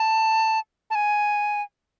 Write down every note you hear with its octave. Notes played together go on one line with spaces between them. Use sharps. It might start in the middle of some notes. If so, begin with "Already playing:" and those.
Already playing: A5
A5
G#5